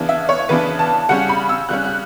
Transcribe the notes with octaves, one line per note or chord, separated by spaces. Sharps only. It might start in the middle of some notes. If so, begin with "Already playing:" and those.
Already playing: C#3 E3 B3 D4
E5
C#5
C#3 E3 B3 D4 B4
A5
C#3 G3 C#4 F#5
B5
E6
C#3 G3 C#4 F#6
F#6